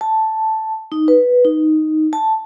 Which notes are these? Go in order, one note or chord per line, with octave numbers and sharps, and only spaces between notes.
A5
D#4
B4
D#4
A5